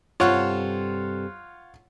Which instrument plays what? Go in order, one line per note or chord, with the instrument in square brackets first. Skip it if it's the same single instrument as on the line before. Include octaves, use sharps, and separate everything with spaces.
[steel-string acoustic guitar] G2 C3 A4 [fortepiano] F4 C#5 F#5